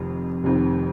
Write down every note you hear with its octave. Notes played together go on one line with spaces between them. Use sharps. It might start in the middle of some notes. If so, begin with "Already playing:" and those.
Already playing: F1 F2 D#3
F1 F2 D#3